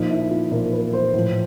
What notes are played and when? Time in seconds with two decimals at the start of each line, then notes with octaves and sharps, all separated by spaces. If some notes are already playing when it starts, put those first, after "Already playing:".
Already playing: A#2 F3 D#4
0.11 E4
0.31 F4
0.51 A#2 F3 A#4
0.73 B4
0.93 C5
1.14 A2 F3